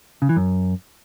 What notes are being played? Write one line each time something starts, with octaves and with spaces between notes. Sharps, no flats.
C#3
E3
F#2